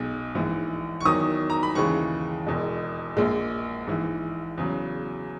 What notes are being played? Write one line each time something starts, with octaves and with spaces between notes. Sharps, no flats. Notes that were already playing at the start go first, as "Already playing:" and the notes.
Already playing: B1 B2 G#3
A#1 G#2 E3
C#6
E2 D#3 F#3 D#6
A#5
B5
D#2 C#3 E3 G#3 C#6
E1 E2 B2 G#3
A#1 A#2 G#3
A#1 G#2 E3
E2 C#3 F#3